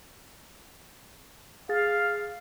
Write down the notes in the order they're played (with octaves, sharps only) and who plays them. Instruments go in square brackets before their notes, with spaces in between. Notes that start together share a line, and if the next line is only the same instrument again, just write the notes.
[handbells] G#4 A6 [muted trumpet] F5